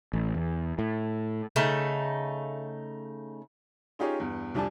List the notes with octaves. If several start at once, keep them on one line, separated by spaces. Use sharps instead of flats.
A1
E2
A2
C#3 A3 D#4
C#4 D#4 F4 G4 G#4 C#5
E2 G2
C2 F2 G3 D4 G#5 A5